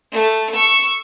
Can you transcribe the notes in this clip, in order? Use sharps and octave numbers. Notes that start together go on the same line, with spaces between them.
A3
C#6 E6